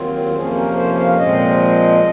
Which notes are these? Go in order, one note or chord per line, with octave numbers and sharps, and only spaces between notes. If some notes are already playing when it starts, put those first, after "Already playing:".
Already playing: D#2 D#3 F#3 C4 F4
F2 C3 F3 A#3 C#4 G#4
A#4
C5
F5
A#2 F3 G#3 C4 D#5